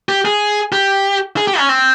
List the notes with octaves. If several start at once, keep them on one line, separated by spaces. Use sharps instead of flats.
G4
G#4
G4
G#4
G4
C#4
C4